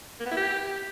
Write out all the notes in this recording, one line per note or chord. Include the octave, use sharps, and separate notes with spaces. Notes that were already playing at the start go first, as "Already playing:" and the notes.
A#3
B3
E4
G4